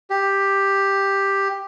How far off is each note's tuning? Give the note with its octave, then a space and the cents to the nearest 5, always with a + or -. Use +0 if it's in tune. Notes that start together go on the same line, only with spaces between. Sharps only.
G4 +5